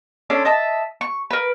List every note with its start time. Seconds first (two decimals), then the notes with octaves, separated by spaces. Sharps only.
0.30 C#4 D4 A4 C6
0.45 D#5 E5 A5
1.01 C#6
1.30 A#4 B4